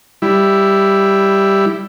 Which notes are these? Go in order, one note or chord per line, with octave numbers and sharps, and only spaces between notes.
G3 E4